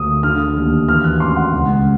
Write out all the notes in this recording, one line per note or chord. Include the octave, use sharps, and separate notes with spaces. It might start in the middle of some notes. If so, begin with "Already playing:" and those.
Already playing: D2 D#6
D3 F6
D#2
E3 F6
F#6
A1 C6
F#5
C#2